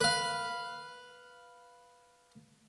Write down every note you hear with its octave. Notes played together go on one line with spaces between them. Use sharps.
B4 F5